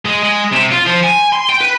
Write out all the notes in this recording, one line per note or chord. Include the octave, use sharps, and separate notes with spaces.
G#3
G#3
C3
F4
F3
G#5
C6
G5
B4